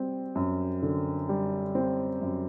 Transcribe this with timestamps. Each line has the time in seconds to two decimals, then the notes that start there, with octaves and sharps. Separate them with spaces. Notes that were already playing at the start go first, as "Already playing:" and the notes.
Already playing: G3 C4
0.35 F#2
0.82 D3
1.29 G3
1.75 C4
2.21 F#2